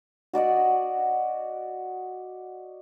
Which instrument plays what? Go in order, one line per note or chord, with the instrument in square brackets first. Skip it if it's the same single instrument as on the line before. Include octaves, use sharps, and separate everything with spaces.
[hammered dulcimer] F#4 D5 D#5 F#5